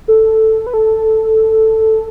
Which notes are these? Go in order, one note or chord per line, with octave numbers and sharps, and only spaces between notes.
A4
B4
A4